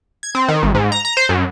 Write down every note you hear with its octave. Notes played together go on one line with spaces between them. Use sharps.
G#6
C4
D#3
G#1
G#2
A#5
A#5
C5
F#2